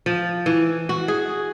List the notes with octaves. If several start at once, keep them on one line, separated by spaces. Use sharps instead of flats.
F3
E3
F#4
G#4